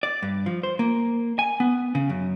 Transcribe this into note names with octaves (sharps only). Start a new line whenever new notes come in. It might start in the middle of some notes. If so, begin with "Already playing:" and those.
D5
G2
F3
C5
A#3
G#5
B3
C#3
F#2